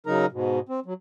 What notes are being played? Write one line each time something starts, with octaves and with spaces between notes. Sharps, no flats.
C#3 F#3 D#4 A#4 A#5
G#2 B2
C4
F#3